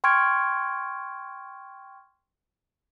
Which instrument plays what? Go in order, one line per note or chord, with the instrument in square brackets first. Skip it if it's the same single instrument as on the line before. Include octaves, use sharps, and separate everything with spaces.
[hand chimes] G5 C6 C#6 F6 G#6 D7